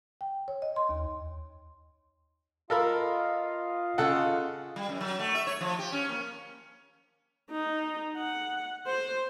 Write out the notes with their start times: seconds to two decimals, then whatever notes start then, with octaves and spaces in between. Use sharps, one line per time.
0.21 G5
0.48 C#5
0.62 D#5
0.76 C6
0.89 D#2
2.70 F4 A4 A#4 D#5 F5 B5
3.98 C#3 A4 F#5
4.76 G3
4.89 F#2
5.01 F#3
5.19 A3
5.35 E5
5.47 C#5
5.61 F3
5.79 G4
5.92 C#4
6.09 A#3
7.51 D#4
8.17 F#5
8.87 C5